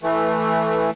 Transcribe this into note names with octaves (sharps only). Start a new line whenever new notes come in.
E3 A3